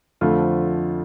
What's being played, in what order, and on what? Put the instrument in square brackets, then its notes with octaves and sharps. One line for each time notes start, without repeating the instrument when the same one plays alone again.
[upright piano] F2 D3 F3 A3 F4